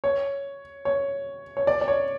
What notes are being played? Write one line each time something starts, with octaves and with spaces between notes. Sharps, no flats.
C#5
C#5
C#5
D5
D5
C#5